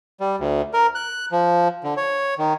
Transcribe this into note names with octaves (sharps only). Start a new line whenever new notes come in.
G3
D2
A#4
F#6
F3
D3
C#5
D#3